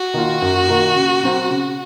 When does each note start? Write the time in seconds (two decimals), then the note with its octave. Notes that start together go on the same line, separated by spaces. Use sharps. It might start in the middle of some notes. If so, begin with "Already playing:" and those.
Already playing: F#4
0.14 D#3 A#3 F4
0.42 F#2
0.68 D#3 A#3 F4
0.95 C#3
1.23 F#3 C4
1.50 C#3